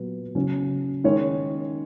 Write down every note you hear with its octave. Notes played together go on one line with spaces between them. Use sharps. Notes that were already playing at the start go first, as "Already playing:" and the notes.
Already playing: A#2 F#3 B3
C#3 F#3 C#4
D#3 G#3 C#4 C#5